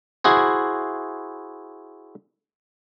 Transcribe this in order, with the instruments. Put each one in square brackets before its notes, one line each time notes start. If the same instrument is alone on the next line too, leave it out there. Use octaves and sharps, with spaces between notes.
[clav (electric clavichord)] E4 F#4 G#4 C5